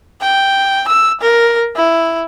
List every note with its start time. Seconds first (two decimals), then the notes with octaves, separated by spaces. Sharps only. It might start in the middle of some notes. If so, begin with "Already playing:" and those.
0.21 G5
0.88 E6
1.21 A#4
1.76 E4